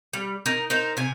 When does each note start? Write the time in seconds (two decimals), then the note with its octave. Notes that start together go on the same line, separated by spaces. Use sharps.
0.13 G3
0.46 D#4 A#4
0.70 D#4 A#4 C5
0.97 C3 G#5